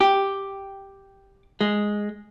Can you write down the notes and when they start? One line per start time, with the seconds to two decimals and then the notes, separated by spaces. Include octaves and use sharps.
0.01 G4
1.61 G#3